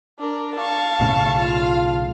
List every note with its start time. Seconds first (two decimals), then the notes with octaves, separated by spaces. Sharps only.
0.20 D4 A#4
0.56 F5 A5 C#6
1.00 B1 A2 C#3
1.38 F4 F5